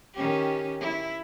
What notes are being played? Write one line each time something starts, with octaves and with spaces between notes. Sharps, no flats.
D#3 C#4 G4
E4